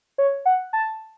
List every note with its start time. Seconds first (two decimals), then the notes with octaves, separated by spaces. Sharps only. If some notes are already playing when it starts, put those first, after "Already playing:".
0.18 C#5
0.46 F#5
0.73 A5